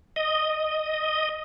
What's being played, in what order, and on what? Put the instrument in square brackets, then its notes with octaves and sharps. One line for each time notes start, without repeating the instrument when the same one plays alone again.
[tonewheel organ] D#5